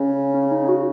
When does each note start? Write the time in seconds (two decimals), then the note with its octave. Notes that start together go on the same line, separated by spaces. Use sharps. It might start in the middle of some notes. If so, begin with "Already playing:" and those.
Already playing: C#3 C#4
0.34 C#4
0.51 D#4
0.68 F#4